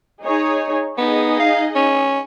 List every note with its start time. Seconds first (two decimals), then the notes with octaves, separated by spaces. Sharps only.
0.21 D#4 G#4 C#5
0.98 B3 D#4 G#4 D#5
1.40 F5
1.75 C#4